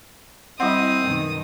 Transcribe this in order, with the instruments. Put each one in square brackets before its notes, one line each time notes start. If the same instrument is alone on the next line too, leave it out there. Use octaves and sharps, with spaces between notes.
[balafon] G3 F#5 [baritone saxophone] C4 [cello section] E4 D#5 [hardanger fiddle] D#6
[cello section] F#2 B2 D#3